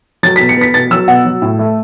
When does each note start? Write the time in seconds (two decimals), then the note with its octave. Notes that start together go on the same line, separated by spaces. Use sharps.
0.23 F#3 A6
0.36 B6
0.40 B2
0.49 C#7
0.57 B3 B6
0.74 B2 A6
0.91 F#3 E6
1.08 B2 F#5
1.25 F#3
1.42 A2
1.59 A3